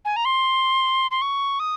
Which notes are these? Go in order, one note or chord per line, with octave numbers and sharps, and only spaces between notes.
G#5
A#5
C6
C6
C#6
D#6